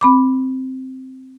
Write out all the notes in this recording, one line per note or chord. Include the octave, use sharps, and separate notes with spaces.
C4 B5 D6